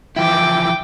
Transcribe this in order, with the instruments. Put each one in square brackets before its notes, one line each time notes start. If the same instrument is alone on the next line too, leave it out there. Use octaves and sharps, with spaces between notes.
[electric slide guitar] E3 F3 E4 [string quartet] G5 D6